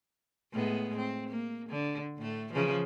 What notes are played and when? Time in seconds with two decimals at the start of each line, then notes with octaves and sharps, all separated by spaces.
0.53 A2 G#3 B3
0.97 C4
1.29 A#3
1.69 D3
2.18 A2 A3
2.53 C#3 E3 F3